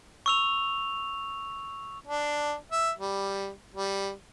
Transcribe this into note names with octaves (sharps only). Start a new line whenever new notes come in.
C#6 E6 F7
D4
E5
G3
G3